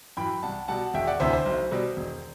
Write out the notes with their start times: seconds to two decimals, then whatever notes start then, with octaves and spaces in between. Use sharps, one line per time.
0.17 F#2 E3 G5 B5
0.43 C2 F#5 A5
0.68 B2 G3 F#5 A5
0.94 E1 E5 G5
1.07 D5 F#5
1.20 D2 C3 E3 C5 E5
1.33 C5
1.46 B1
1.71 B2 G3
1.97 E1